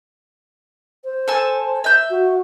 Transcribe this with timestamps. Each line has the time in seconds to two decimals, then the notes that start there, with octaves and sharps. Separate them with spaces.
1.04 C5
1.28 A4 G#5 E6
1.84 E5 G6
2.10 F#4